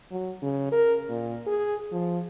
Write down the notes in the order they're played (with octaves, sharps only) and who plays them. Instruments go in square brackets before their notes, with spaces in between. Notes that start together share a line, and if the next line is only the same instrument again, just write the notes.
[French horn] F#3
C#3
A#4
A#2
G#4
F3